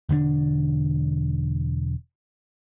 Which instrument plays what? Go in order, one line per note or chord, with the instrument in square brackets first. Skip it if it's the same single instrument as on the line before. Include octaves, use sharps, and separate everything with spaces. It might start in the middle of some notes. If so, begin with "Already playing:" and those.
[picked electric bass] E1 D3 C4 D4